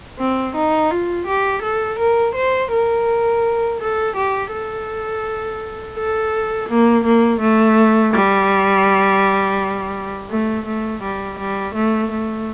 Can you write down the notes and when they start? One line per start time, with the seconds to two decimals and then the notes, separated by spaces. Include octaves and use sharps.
0.19 C4
0.56 D#4
0.91 F4
1.27 G4
1.63 A4
1.99 A#4
2.35 C5
2.72 A#4
3.81 A4
4.16 G4
4.53 A4
5.97 A4
6.69 A#3
7.05 A#3
7.41 A3
8.14 G3
10.31 A3
10.66 A3
11.03 G3
11.39 G3
11.75 A3
12.11 A3